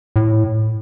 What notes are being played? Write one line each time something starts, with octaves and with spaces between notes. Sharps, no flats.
A2